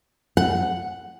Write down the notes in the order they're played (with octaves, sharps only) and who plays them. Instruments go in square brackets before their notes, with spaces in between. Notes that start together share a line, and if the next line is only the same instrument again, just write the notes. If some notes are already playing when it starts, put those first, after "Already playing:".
[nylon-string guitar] F#5